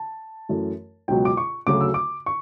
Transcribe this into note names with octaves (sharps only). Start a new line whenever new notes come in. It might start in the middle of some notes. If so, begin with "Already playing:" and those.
Already playing: A5
F#2 E3 A3
C#2 B2 F#3 G5
D6
C#6
D2 C#3 F#3 A3 D6
E6
D6
C#6